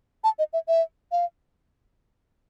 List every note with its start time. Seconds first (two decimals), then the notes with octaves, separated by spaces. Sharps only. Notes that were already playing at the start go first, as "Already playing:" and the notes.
0.24 A5
0.39 D#5
0.53 E5
0.68 E5
1.12 F5